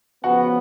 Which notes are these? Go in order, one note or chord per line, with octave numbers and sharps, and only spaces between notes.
C#3 F3 B3 F#4 F#5